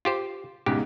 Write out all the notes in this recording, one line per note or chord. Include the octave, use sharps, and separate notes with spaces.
F4 G4 C5
E2 G#2 C#3 G4